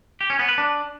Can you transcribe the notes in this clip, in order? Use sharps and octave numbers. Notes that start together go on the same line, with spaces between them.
G4
C#4
B3
B4
D4